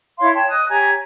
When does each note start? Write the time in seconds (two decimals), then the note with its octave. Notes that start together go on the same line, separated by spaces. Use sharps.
0.19 E4 C#5 F5 C6
0.35 C#5 G5 A5
0.49 D#5 D#6 F#6
0.69 G4 C#5 G#5 A#5